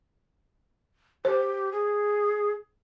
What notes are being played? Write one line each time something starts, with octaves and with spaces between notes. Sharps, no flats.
G4 C5
G#4